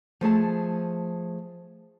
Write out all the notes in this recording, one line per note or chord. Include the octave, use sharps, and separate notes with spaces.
F3 A3 G#4 A5